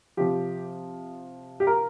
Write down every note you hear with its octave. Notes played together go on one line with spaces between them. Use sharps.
C3 F3 G4
G4
A#4